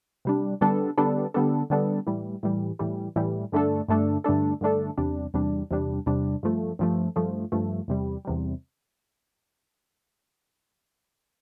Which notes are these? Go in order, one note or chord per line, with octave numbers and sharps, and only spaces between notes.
C3 G3 D4
D3 G3 B3 D4 A4
D3 G3 B3 D4 A4
D3 G3 B3 D4 A4
D3 G3 B3 D4 A4
A2 E3 G3
A2 E3 G3
A2 E3 G3
A2 E3 G3
G2 D3 A3 D4 A4
G2 D3 A3 D4 A4
G2 D3 A3 D4 A4
G2 D3 A3 D4 A4
E2 C3 G3 D4
E2 C3 G3 D4
E2 C3 G3 D4
E2 C3 G3 D4
G2 F3 A3
G2 F3 A3
G2 F3 A3
G2 F3 A3
E2 C3 G3
E2 C3 G3